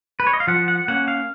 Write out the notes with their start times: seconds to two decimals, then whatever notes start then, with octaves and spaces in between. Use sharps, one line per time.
0.20 B4
0.27 C#5
0.33 D#5
0.40 F5
0.47 F3 F#5
0.68 F#5
0.88 A#3 C#4 F#5
1.08 F5